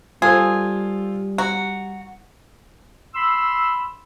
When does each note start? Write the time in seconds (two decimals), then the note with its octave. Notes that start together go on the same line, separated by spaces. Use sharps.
0.22 G3 F4 G#4 A4 C5
1.38 F#4 A#5
3.15 B5 C6 E6